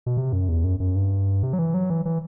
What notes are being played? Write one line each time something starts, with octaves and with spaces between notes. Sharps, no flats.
B2
C3
F#2
E2
F#2
F#2
G2
C3
F#3
E3
F#3
E3
E3